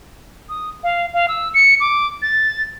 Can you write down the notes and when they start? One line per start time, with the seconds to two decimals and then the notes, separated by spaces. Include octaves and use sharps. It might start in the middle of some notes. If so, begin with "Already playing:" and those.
0.49 D#6
0.84 F5
1.14 F5
1.28 E6
1.54 C#7
1.80 D6
2.22 A6